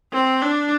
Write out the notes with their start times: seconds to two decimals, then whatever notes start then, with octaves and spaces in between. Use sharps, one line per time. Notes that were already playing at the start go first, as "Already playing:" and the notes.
0.13 C4
0.42 D4